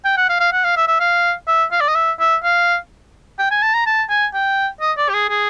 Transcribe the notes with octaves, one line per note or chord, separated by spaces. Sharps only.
G5
F#5
F5
F5
F#5
F5
E5
E5
F5
E5
F5
D5
D#5
E5
E5
F5
G5
G#5
A5
A#5
A5
G#5
G5
D#5
D5
G4
G#4
G#4